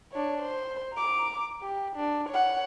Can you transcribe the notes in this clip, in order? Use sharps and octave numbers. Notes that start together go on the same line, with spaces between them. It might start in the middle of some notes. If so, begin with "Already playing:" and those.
D4 C#5
C5
A#5 D6
G4
D4
C#5 F#5